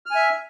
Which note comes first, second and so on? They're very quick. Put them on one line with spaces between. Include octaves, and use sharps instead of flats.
F6 G#5 E5